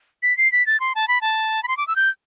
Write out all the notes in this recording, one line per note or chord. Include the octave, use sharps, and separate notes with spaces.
B6
C7
B6
A6
C6
A5
B5
A5
B5
C6
D6
E6
G6